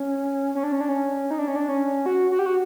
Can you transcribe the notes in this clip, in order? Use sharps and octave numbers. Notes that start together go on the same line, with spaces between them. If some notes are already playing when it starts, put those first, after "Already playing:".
Already playing: C#4
C#4
D4
C#4
D4
C#4
D#4
D4
C#4
D4
C#4
F#4
F#4
G4
F#4